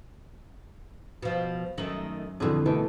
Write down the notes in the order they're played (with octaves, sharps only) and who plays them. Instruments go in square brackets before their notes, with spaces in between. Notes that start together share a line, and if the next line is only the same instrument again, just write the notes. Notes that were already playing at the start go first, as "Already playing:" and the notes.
[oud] B2 F3
[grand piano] F#2 F#7 [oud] D#3 A3
[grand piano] F2 D3 E3 [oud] B2 G#4
[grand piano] B2 E3 A3 [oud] D#3